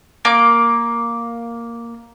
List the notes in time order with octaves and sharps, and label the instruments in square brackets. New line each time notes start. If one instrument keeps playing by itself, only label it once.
[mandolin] A#3 D6